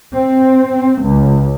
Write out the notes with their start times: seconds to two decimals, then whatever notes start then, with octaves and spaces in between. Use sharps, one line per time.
0.14 C4
1.01 C#2